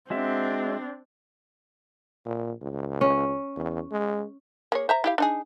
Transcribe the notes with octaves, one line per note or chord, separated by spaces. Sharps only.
G#3 C4 D4 F#4 E5
A#2
C#2
C#4
E2
G#3
A#3 G#4 C#5
C5 E5 A#5
E4 G4 F5
D4 D#4 G#4